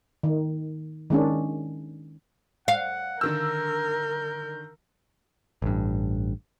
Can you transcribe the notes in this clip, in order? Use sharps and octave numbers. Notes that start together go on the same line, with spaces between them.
D#3
D#3 G#3 C#4 D4
F5 F#5
D3 D#3 A#4 E6 G6
A1 G2